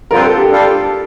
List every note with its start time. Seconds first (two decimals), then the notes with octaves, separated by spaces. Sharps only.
0.11 G2 D3 F3 C4 F4 A#4
0.24 A4
0.37 G4
0.50 G3 D4 F4 A4